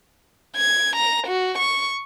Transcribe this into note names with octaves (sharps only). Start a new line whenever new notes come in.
G#6
A#5
F#4
C#6